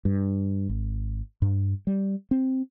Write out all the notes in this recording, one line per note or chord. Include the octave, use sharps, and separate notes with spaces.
G2
G#1
G2
G3
C4